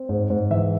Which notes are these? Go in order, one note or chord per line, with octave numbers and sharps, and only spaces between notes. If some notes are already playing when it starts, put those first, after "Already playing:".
Already playing: C4
G#2
G#2
E3 E5